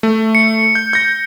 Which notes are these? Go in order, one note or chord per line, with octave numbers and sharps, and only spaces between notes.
A3
C#7
G6
G6 A#6